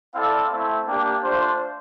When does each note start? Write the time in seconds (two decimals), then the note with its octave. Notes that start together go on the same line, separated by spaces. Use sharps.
0.14 C4 E4 A4 D5 F5
0.51 A3 C4 E4
0.86 A#3 D4 G4
1.23 A3 D4 F4 C5